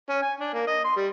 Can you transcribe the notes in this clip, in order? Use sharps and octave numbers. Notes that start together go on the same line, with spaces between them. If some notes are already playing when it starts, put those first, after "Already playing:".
C#4
G#5
D4
A#3
D#5
C6
G3